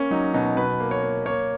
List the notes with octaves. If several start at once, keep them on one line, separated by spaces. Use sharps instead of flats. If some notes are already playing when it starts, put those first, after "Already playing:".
Already playing: A#3 C#4
F#3 D#4
B2 D#4
B2 B4
A#3
C#5
A#3
A#3 C#5